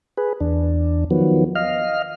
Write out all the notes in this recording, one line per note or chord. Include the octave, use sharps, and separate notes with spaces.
G#4 B4
E2 D4
D#3 F3 F#3 B3
D#5 F5 F6